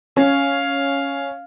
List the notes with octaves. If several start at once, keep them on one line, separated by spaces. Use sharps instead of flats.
C#4 F5